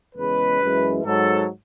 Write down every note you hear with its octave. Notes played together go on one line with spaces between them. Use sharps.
E2 C#3 G#3 B4
F#2 E3 G#3
G#2 F#3 A4